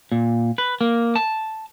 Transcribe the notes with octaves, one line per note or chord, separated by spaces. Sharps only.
A#2
B4
A#3
A5